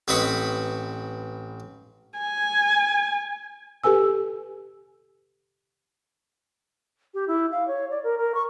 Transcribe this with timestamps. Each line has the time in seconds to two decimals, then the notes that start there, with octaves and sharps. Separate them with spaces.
0.08 A1 C4 B4 D#5 B5 C#6
2.19 G#5
3.84 G4 A4 B4 G#5 E6
7.14 G4
7.28 E4
7.51 F5
7.68 C#5
7.91 D5
8.04 A#4
8.18 A#4
8.35 C#6